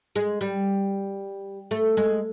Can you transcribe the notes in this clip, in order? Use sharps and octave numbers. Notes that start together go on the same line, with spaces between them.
G#3
G3
A3
G#3